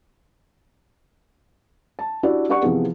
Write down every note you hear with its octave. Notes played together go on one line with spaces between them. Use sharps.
A5
D4 E4 F#4 G4 D5
D4 G4 D5 F#5 C#6
C3 E3 F3 B3 G#4